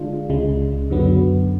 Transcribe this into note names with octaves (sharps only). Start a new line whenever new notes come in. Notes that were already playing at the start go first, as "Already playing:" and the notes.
Already playing: D3 G#3 D4 F4
C#2 C#3 G#3
F#2 D3 F#3 B3